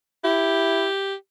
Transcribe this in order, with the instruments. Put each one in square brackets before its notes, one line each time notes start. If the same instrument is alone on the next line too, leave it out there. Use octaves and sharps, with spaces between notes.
[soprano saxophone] E4 [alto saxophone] G4